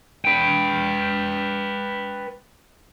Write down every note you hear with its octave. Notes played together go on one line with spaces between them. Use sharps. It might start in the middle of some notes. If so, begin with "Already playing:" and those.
B4 G5